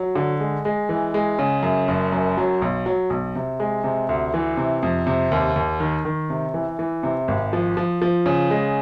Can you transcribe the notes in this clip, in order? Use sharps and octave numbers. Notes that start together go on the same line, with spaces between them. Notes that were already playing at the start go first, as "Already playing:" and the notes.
Already playing: F#3
D3
G#3
G#3
E3
G#3
C#3
F#2
F#1
F#2
F#3
B1
F#3
B1
C3
G#3
C3
D2
E3
C3
F2
C3
D#2
D#2
D#3
D#3
C3
E3
E3
C3
G#1
F3
F3
F3
C#3
G#3